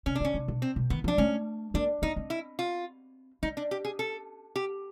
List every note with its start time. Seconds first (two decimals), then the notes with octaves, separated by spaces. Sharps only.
0.06 C3 C#4
0.15 D4
0.20 D3 C#4
0.34 C3
0.48 B2
0.62 C4
0.76 B2
0.90 D#3 B3
1.04 F3 D4
1.18 A3 C#4
1.74 A#3 D4
2.02 B3 D#4
2.16 C4
2.30 E4
2.59 F4
3.43 C#4 D#4
3.57 D4
3.71 G4
3.85 G#4
3.99 A4
4.56 G4